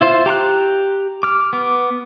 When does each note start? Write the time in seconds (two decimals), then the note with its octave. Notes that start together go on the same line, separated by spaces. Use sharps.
0.01 E4 F4 C5
0.26 G4 A#5 C#6 F#6
1.23 D6 F6
1.53 B3 D6